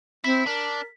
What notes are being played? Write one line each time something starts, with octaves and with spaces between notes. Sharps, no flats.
C4 E4 B6
D4 A#4